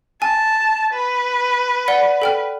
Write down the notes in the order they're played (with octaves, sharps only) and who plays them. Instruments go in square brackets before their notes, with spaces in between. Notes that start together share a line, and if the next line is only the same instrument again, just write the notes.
[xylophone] G#5 [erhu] A5
[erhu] B4
[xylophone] D5 F#5 G7
A4 G5 F6